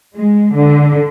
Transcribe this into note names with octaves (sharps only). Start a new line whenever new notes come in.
G#3
D3